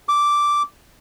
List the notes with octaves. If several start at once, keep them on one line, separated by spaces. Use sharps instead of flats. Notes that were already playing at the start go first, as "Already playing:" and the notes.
D6